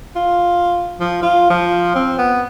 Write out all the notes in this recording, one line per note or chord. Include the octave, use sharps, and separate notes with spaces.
F4
F3
F4
F3
C4
B3